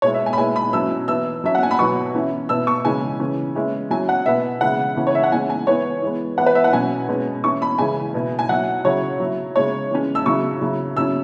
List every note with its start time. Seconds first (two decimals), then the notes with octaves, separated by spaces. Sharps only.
0.02 B2 G#3 E4 C#5
0.14 E5
0.26 G#5
0.33 B5
0.38 B2 G#3 E4 G#5
0.56 B5
0.73 B2 F#3 C#4 E4 E6
1.08 E3 B3 E4 E6
1.44 F#3 C#4 E4 E5
1.55 F#5
1.63 G#5
1.71 B5
1.78 B2 F#3 B3 C#6
2.14 E3 C#4 E4
2.49 B2 B3 E4 E6
2.67 C#6
2.85 C#3 E3 G#3 C#4 G#5
3.20 C#3 E3 C#4
3.55 E3 G#3 C#4 E4
3.90 F#3 C#4 E4 G#5
4.09 F#5
4.26 B2 B3 E4 E5
4.61 C#3 E3 G#3 E4 F#5
4.96 C#3 E3 C#4 E4
5.07 C#5
5.15 E5
5.23 F#5
5.32 E3 G#3 C#4 G#5
5.50 G#5
5.67 E3 B3 E4 C#5
6.02 E3 G#3 B3
6.38 E3 B3 E4 F#5
6.46 B4
6.55 E5
6.64 F#5
6.73 B2 F#3 C#4 G#5
7.09 B2 G#3 C#4
7.44 E3 C#4 E4 C#6
7.62 B5
7.78 C#3 E3 G#3 C#4 E4 G#5
8.14 B2 B3 E4
8.39 G#5
8.49 F#3 E4 F#5
8.85 C#3 F#3 E4 C#5
9.20 F#3 E4
9.55 C#3 G#3 E4 C#5
9.91 E3 G#3 C#4
10.15 E6
10.25 C#3 F#3 C#4 E4 C#6
10.61 C#3 F#3 E4
10.96 C#3 F#3 C#4 E4 E6